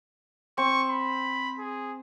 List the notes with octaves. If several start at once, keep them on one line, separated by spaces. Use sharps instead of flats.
C4 C#6
B5
G#4